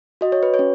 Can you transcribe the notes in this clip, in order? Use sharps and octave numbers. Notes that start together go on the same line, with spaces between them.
F#4 D#5
C#5
B4
C#5
C#4